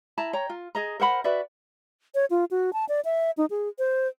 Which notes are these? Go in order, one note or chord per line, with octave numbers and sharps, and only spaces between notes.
E4 A5 A#5
C#5 G5 A#5
F4
G#4 D#5 A#5
A#4 C5 F#5 B5
F#4 B4 D5 E5
C#5
F4
F#4
A5
D5
E5
D#4
G#4
C5